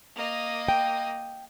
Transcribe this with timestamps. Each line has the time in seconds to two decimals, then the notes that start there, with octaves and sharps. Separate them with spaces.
0.16 A#3 D#5
0.68 G5